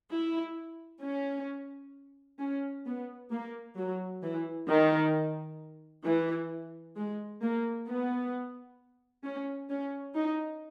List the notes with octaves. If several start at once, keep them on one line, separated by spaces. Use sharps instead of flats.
E4
C#4
C#4
B3
A#3
F#3
E3
D#3
E3
G#3
A#3
B3
C#4
C#4
D#4